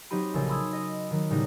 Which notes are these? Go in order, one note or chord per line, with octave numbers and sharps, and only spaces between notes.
F#3 C4 D#4 G4 B5 D#7
A#1 C#3 A4 G#5
B5 C6 D#6 E6 G#6
D#5
D#3 F#3
A2 C#3 G3 B3 D#4